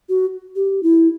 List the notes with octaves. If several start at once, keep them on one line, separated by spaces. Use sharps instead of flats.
F#4
G4
E4